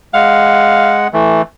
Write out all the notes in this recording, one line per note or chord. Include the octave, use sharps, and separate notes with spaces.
G#3 F5 F#5
E3 A3